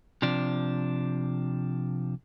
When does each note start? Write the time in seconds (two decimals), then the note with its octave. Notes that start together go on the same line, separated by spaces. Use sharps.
0.22 C3 F3 D4